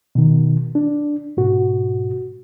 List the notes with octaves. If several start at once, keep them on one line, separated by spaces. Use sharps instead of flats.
B2 D#3
D4
G#2 B2 F#4